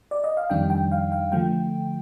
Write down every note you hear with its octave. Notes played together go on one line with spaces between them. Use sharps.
D5
D#5
F5
F2 D#3 G3 D4 G5
G5
F5
F5
D3 F3 A3 G5